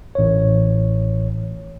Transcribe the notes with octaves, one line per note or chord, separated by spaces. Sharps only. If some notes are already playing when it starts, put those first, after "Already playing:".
A1 C#5